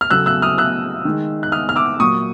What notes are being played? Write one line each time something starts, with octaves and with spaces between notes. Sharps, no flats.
F6
C#3 F#3 A3 E6 F#6
E6 F#6
D#6 F6
E6 F#6
D#3 G#3
F#6
D#6 F6
F6
D6 E6
A#2 F#3 A#3 C#6 D#6